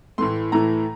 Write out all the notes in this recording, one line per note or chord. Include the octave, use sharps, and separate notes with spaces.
A2 E3 A3 C6
A2 E3 A3 A#5